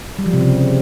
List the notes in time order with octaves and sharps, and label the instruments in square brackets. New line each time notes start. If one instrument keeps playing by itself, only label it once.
[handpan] G3
F3
C3
C#3